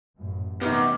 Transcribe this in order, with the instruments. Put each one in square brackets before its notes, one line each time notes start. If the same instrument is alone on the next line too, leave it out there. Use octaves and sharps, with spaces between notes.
[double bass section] A1 F#2 A2
[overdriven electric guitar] F#2 [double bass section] C3 E3 A3 [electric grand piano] B3 D#4 [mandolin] G4 F6